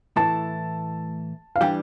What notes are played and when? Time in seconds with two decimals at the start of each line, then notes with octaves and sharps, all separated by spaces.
0.16 A2 E3 A3 E4 A5
1.56 F5
1.60 E3 G3 D4 G4 G5